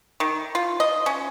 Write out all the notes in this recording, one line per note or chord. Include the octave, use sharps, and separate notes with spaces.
D#3
F4
D#5
C#4